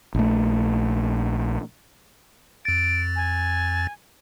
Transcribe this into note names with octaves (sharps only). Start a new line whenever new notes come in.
A#1 A3
F2 A6 D7
G#5